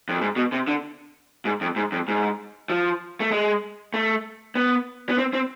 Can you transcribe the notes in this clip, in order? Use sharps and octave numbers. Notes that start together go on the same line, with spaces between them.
F2
G#2
B2
C3
D3
G#2
F2
G#2
F2
G#2
F3
A3
G#3
A3
B3
B3
C4
C4